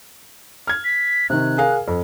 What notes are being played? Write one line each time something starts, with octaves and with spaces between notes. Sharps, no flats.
F6 G#6
B6
C3 D#3 F#6
G#4 A#4 F5
F2